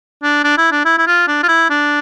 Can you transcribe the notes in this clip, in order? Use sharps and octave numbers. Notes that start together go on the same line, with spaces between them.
D4
D4
E4
D4
E4
E4
F4
D4
F4
E4
D4